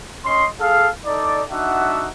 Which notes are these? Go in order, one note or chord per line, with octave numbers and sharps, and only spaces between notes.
C#4 D#5 C6
G#4 A4 F5
D#4 A4 D5
D4 D#4 F#4 E5 F#5